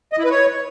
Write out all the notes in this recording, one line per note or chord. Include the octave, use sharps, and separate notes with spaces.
D#5
E4
B4
C#5